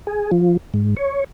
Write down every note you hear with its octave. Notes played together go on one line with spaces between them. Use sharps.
G#4
F3
G#2
C#5